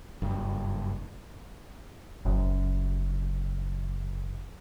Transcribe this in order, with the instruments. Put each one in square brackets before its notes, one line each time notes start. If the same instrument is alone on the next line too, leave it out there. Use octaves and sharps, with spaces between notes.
[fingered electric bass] F#1 G2
[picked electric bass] F#1 F#2